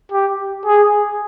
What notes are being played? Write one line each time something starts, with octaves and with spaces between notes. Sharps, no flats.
G4
G#4